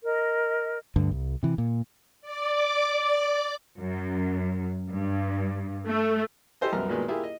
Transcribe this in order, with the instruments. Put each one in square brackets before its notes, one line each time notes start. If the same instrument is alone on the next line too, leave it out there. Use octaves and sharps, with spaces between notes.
[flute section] A#4 D#5
[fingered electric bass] D2 G2 D3
C2
C3 E3
A#2
[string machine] D5 D6
[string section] F#2
G2
A3
[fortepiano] E4 G4 A4 C5 D#5
C2 F#2 B3 A#5 F6
A#2 D#3 F#3 G#3 A#3 B3
A#3 E4 F4 G4 G#4
D#5